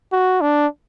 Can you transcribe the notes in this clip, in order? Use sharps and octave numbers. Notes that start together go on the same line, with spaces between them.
F#4
D4